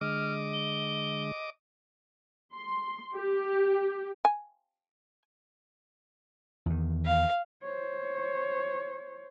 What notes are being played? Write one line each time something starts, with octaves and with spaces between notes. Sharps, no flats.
D3 G#3 D#5 D6 F6
G7
C6
G4
G#5
E2 D#3
F5
C5 C#5